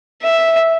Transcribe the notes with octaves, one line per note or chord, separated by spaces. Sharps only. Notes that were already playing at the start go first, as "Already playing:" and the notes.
E5